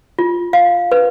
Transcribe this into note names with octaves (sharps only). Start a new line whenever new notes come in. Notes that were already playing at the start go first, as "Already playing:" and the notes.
F4
F5
B4